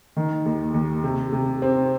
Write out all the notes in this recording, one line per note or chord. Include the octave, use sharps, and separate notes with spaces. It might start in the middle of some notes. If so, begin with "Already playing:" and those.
D#3
D#2
D#2
C3
C3
C4